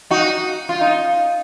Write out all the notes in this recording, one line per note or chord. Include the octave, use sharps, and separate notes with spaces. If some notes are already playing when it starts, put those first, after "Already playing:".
D#4 F#4
F4
D#4